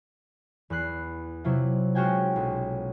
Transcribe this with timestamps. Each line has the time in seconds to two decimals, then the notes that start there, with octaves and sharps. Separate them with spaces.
0.70 E2 B3 F#6 C7
1.44 C3 F#3 E4 F4
1.95 G#3 C#4 F4 F#4 G5 G#5
2.36 B1